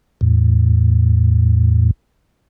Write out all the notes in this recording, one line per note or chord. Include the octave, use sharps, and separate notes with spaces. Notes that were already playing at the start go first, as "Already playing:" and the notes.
E2 A2